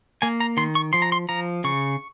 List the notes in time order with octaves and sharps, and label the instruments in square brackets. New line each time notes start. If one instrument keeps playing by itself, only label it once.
[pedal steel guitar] A#3 G#5
A#5
D#3 C6
C#6
F3 C6
A#5
C6
F3 A#5
C#3 C#6